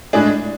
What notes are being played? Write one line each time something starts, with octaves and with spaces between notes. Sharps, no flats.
A2 G#3 D4 G#4